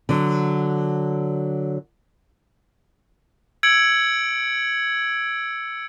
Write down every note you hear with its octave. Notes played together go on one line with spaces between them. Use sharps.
D3 F#3
E6 G#6 C#7 D7 F#7